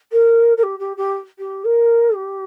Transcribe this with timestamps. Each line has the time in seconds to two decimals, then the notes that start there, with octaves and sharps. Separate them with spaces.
0.12 A#4
0.57 A#4
0.63 G4
0.79 G4
0.97 G4
1.38 G4
1.64 A#4
2.15 G4